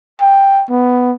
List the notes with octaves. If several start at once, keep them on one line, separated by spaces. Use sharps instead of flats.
G5
B3